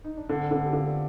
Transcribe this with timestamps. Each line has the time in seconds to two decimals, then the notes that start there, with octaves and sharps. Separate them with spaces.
0.04 D#4
0.17 D4
0.29 D3 C4
0.51 D3 B3 D4
0.66 G4
0.73 D3 D4 F4